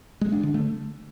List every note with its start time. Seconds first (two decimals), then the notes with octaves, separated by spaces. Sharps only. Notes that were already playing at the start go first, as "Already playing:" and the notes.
0.21 G#3
0.32 D4
0.43 D3
0.54 A3